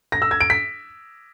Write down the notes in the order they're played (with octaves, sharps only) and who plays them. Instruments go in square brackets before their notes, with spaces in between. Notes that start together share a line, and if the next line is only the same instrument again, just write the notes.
[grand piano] A#6
E6
G#6
D7
B6